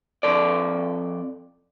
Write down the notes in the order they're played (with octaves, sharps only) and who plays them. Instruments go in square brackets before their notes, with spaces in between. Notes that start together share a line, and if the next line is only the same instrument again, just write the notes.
[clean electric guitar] F2 A4 D5